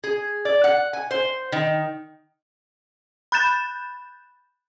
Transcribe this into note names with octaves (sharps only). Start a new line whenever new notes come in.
G#4
D5
F#5
G#5
C5
D#3
B5 F#6 G6 A6 E7